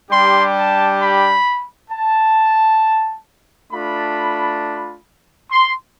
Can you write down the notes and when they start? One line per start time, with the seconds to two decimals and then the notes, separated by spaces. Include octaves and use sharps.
0.10 G3 D4 G4 C6
0.56 A5
1.01 B5
1.91 A5
3.71 A3 D4 F4 B5
5.51 C6